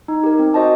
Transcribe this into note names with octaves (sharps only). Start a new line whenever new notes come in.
D#4
G4 A#4
C4
F#4 C5 D#5 A5